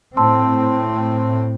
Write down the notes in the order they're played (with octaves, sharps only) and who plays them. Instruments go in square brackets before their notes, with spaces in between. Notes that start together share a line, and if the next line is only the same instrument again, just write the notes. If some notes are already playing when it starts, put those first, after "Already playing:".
[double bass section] A2 C4 [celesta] A5 C6 E6